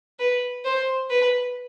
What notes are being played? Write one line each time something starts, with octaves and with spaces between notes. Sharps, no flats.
B4
C5
B4